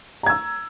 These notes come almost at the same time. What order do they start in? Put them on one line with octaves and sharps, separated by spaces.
A#5 G#6 E6